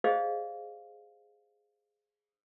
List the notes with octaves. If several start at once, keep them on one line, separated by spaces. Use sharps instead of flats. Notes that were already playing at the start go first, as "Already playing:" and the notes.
G4 G#4 C5 D5 D#5 F5